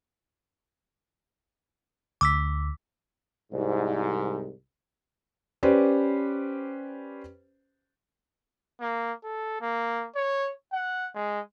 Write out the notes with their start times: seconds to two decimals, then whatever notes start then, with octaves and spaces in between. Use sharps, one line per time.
2.21 D2 D6 E6 B6
3.52 C2 G#2
5.63 C#4 G4 B4 C5 D5
8.81 A#3
9.24 A4
9.61 A#3
10.15 C#5
10.73 F#5
11.15 G#3